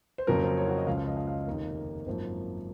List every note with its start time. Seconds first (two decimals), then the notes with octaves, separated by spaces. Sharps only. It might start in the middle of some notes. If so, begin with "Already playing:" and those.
0.18 C5
0.27 F2 C#3 F#3 A#3 A#4
0.42 C5
0.57 C#5
0.67 F#4
0.77 D#5
0.87 C#2 C#3 F3 F5
0.98 F5
1.07 D#5
1.17 F5
1.27 F5
1.32 D#5
1.47 F1 D#2 D#3 A#3
2.06 G#1 F#2 F3 A#3 C5